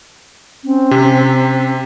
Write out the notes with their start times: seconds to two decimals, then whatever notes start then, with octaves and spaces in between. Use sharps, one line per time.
0.64 C4 C#4
0.91 C3